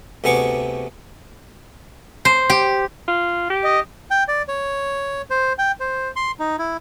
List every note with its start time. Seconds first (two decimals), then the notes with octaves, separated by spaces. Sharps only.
0.24 D2 C3 B3 G#4 C#6 D6
2.25 C5
2.50 G4
3.08 F4
3.50 G4
3.64 D#5
4.11 G5
4.28 D5
4.48 C#5
5.30 C5
5.58 G5
5.80 C5
6.16 C6
6.39 D#4
6.59 E4